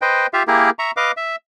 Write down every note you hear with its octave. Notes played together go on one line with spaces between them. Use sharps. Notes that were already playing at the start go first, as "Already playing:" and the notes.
B4 C5 D#5 G5
F4 G4 E5 F5
A#3 E4 G4 G#4 A#4
E5 A#5 C#6
B4 D#5 F5 D6
E5